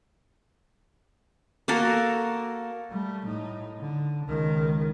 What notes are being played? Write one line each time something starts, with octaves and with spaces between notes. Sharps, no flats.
A#3 F#4 A4 A#4
G3 A3
A2 D#4
D3
C#2 D#3